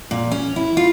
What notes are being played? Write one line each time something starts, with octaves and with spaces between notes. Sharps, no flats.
A#2
C#4
E4
F4